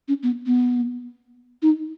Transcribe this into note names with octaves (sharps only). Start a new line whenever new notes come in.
C#4
B3
B3
D#4